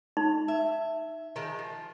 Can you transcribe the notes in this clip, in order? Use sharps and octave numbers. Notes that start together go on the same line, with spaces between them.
D#4
E5
D#3 F3 G#3
F3